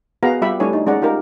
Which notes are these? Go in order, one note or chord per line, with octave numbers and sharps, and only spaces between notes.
B3 F#4 G#4 B4 F5 A#5
G3 F4 G4 E5 B5
G3 A3 D4 E4 C#5 G#5
D#4
G#3 C#4 D5 F#5 A#5
D#4 F4 G4 A#4